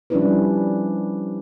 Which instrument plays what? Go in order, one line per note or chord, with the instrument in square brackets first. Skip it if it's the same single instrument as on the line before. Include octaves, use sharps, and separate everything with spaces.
[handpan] F3 G3 C#4 D4 E4 B4